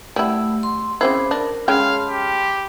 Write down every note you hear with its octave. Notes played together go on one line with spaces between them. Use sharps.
G3 A3 E4 F#5 E6
C6
C#3 C4 E4 C5 B5 D6
D4 A#4
G#3 C#4 F5 G5 A5 B5 C6
G4